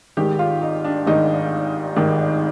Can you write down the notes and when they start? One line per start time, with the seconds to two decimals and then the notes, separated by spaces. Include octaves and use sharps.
0.17 G#1 G#2 D#3 G4
0.39 F4
0.62 D#4
0.85 D4
1.07 G#1 G#2 D#3 D#4
1.96 G#1 G#2 D#3